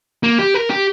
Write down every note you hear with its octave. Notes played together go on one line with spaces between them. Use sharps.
A#3
G4
A#4
G4